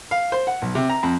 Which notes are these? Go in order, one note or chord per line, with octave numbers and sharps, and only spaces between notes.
F5
C5
F#5
B1
C3
A#5
F2